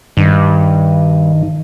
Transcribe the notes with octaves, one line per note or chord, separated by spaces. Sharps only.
G2 D#3